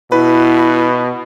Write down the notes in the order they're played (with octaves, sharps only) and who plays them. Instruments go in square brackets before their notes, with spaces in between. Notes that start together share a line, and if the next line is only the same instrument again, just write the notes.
[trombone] B2 [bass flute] E4 [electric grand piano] B4